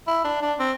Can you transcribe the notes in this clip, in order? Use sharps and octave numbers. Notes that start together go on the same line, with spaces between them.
E4
D4
D4
C4